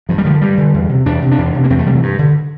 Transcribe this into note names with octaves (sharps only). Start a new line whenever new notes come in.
G2 F3
G3
D3 F3
G2 G3
D3
E2
C3
E2 D4
C3
D4
E2
C3
A#3
E2 C4
A3
C3 G3
E3
G2
D3